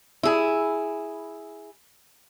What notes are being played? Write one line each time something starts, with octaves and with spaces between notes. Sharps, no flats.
E4 G#4